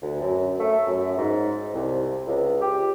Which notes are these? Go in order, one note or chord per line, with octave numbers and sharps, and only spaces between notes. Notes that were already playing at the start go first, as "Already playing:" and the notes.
D2
F#2
A3
F#2
G#2
C2
C#2
G4